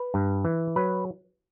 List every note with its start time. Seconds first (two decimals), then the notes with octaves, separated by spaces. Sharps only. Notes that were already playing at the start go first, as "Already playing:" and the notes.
Already playing: B4
0.14 G2
0.45 E3
0.76 F#3 B4